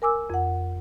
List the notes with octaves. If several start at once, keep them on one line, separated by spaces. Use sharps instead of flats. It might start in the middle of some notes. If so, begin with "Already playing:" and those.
A#4 G#5 D6 E6
F2 F#5